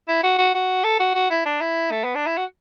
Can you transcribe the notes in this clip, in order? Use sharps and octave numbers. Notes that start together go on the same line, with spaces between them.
E4
F#4
F#4
F#4
A4
F#4
F#4
E4
D4
E4
A3
B3
D4
E4
F#4